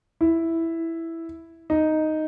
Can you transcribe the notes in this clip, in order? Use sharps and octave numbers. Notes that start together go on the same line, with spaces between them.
E4
D#4